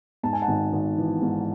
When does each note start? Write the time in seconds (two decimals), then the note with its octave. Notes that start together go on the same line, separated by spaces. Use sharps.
0.23 G#2 A5
0.33 G#5
0.42 F#5 A5
0.48 G#1
0.73 G#1
0.98 E3
1.22 G#2